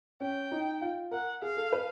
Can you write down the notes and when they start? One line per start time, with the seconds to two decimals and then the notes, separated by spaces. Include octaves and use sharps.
0.20 C#4 G5
0.52 D#4
0.82 F4
1.11 A#4 F#5
1.42 G#4 F5
1.57 A4
1.72 B4